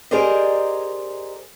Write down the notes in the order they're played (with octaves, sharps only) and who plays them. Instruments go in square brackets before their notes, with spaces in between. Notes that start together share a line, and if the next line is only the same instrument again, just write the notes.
[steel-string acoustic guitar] G4 G#4 A#4 C5 D5 D#5